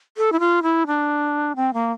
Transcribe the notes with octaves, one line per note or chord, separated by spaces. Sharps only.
A4
E4
F4
E4
D4
C4
A#3